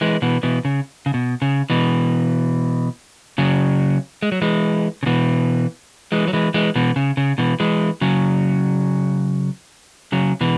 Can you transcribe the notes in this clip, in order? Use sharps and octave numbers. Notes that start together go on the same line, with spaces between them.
E3 G#3
B2 E3
B2 E3
C#3
C#3
B2
C#3
B2 E3
C#3 F#3
G#3
F#3
E3 G#3
C#3
B2 E3
E3 G#3
F#3
E3 G#3
E3 G#3
B2 E3
C#3
C#3
B2 E3
E3 G#3
C#3 F#3
C#3 F#3
B2 E3